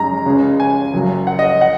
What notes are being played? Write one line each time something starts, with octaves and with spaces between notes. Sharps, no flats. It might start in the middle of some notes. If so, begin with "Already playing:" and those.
Already playing: F#2 C#3 G#3 D#4 A#5
C#2 C#3 G#3 C#4
G#5
F#1 F#2 F#3
F#5
D#5
F#5